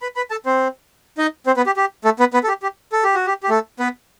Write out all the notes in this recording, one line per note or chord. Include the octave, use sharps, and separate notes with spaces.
B4 B5
B4 B5
A4 A5
C4 C5
D#4 D#5
C4 C5
B3 B4
G4
G4
A3 A4
B3 B4
B3 B4
A4
G4
G4
A4
G4
F#4
G4
G4
A3 A4
B3 B4